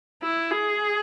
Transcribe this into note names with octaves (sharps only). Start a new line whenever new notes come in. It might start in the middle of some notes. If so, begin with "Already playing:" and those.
E4
G#4